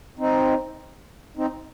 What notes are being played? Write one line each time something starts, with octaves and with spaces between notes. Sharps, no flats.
C4 D#4
C4 D#4